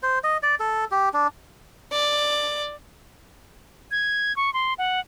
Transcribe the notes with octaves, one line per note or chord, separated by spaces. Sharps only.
C5
D#5
D5
A4
G4
D4
D5
G#6
C#6
C6
F#5